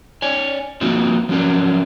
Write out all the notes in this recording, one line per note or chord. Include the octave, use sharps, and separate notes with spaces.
C#5 D5 G#5
F3 A#3 C4 D#4 F4 F#4
F3 F#3 C#4 D4 A#4